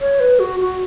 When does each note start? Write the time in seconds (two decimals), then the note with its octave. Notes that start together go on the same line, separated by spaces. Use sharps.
0.01 C#5
0.20 B4
0.40 F#4
0.60 F#4